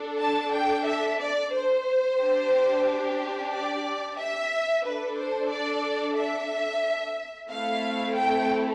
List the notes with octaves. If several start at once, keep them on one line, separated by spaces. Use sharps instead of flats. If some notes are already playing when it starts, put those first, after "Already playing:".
Already playing: D4 A4
A5
G5
E5
D5
C5
D4 G4
D5
E5
D4 A4 B4
C5
D5
E5
A3 C4 E4 A4 F5
G5